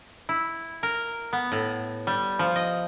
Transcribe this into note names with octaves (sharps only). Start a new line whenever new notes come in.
E4
A#4
B3
A2
G3
F3
D#5